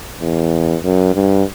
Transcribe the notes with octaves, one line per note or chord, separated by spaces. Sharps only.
E2
F#2
G2